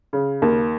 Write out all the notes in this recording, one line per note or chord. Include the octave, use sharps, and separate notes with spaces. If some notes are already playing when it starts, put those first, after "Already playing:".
C#3
D#2